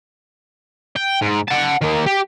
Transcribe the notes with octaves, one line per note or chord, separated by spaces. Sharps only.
G5
G#2
F#5 A5
D#3 A#3
G4